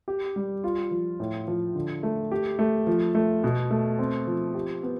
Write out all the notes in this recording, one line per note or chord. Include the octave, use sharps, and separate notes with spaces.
G4
G3
F4
F3
A2
F3
D3
A3
G4
A3
F3
A3
B2
A3
C4
F3
G4
B3